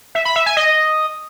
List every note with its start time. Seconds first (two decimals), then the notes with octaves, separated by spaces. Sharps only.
0.15 E5
0.25 B5
0.36 E5
0.46 G#5
0.57 D#5